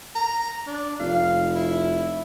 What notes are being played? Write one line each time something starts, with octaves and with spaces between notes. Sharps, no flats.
A#5
D4
F1 F5
E4